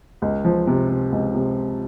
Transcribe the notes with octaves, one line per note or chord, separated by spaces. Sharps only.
C#2
F3
C3
C3
C#2
C3